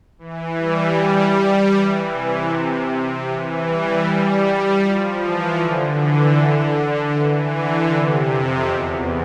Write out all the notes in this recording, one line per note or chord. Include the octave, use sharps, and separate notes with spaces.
E3
G3
E3
C3
E3
G3
G3
F3
E3
D3
E3
D3
E3
D3
C3
F2
E2